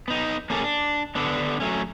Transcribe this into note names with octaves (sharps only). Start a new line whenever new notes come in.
B3 D#4
A#3 C#4 G#4 A4
D4
D3 B3 D4
F#3 A3 C#4